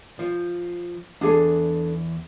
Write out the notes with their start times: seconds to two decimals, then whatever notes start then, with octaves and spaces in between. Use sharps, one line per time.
0.19 F3
1.21 E2 D4 G#4 A4